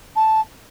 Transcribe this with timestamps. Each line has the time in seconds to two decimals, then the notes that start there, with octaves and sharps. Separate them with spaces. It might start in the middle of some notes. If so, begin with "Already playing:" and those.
0.16 A5